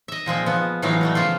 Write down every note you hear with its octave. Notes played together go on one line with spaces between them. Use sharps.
D#5 E5
A#2 F3 G#3 C4
F3 B3
A2 E3 F#3 G#3 F5
B2 G3 A3
C#3 F3 A#3 F4